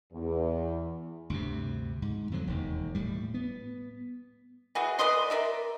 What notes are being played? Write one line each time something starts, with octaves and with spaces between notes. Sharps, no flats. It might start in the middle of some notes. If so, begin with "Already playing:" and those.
E2
D2 G2 C3
G#2
F2 D3 F3 F#3
E1 D#2
A2 G3
B3
E3 F#4 G#4
B4 D5 D#5 C6
A#4 D5 E5